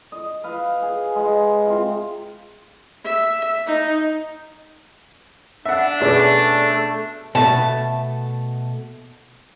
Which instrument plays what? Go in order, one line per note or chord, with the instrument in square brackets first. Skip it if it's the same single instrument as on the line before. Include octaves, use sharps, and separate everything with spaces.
[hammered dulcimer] D#5
B4 F5
G#4
G#3
C3 F4
[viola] E5
D#4
[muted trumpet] D4 [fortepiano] E5 F#5
[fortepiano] B2 [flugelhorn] A3 [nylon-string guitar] C#4 G#4 D5
[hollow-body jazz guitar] B2 A3 [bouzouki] A5